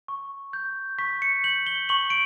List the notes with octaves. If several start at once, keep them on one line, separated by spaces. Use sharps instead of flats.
C#6
G6
C#6 B6
C#7
G6 F#7
G7
C#6 F#7
D7